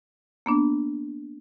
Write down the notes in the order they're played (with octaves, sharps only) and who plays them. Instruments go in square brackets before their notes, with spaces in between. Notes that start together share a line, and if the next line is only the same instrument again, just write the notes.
[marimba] A#3 B3 D4